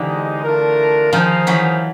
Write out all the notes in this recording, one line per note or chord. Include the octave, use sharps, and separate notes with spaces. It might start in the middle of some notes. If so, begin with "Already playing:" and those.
Already playing: D3 E3 G#3 C4 D#4 G4
A3 D4 F4 A#4
D#3 F3 D#4 G#4 C5 F5
E3 F#3